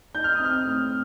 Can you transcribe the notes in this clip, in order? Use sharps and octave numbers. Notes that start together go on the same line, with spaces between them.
D#4 G6
F6
C4 D#6
F6
A2